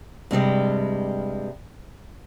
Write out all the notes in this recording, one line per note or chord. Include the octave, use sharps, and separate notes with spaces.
G2 C3 G3 G#3